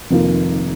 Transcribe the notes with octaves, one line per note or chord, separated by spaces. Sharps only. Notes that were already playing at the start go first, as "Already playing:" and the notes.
F1 F2 D#3 A#3 F4